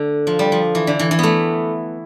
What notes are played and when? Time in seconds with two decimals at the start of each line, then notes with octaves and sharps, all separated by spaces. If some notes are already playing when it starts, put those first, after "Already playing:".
Already playing: D3 A3
0.27 F3
0.39 G3
0.52 F3
0.75 E3
0.87 D3
0.99 E3
1.11 E3
1.19 A3 B3